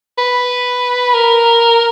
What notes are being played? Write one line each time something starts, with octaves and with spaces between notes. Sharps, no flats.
B4
A#4